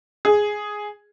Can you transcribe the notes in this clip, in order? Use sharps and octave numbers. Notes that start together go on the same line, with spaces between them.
G#4